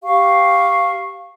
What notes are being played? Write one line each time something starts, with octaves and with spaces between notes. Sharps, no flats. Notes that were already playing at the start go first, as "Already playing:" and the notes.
G4 F5 C#6